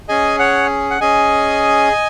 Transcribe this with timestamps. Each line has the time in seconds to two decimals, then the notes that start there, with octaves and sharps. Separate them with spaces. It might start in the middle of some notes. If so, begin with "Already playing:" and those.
0.08 C#4 G#4 D#5 G#5
0.39 C#5 F#5
0.90 F#5
1.01 C#4 G#4 D#5 G#5